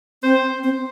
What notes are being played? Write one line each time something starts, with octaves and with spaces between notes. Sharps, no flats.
C4 C5
C4